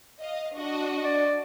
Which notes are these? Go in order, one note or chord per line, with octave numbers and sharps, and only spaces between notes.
D#5 F5
D4 F#4 D#5
D5